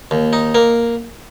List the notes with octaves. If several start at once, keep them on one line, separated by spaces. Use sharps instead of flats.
D#2
D#4
A#3